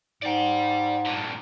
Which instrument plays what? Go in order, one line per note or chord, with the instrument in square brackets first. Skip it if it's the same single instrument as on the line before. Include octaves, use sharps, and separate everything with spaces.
[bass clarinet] G#2 [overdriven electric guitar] D5 G5
[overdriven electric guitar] G2 A#2